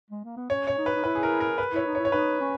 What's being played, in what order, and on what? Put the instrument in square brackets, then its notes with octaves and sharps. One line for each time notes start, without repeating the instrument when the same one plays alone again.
[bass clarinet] G#3
A#3
B3
[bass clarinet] C#4 [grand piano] C#5
[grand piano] C#5
[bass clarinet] D#4
[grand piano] B4
[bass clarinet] D#4
[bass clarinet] E4 [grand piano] B4
[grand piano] G#4
A#4
A#4
B4
[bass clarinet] E4 [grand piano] C#5
[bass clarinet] D#4
[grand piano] C#5
[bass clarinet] E4
[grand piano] C#5
[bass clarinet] D#4 [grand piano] B4
[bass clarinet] C#4